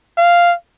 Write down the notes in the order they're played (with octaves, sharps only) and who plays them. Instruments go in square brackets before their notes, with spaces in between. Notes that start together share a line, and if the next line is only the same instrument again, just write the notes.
[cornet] F5